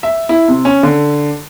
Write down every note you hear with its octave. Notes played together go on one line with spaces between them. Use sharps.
E5
E4
C3
C#4
D3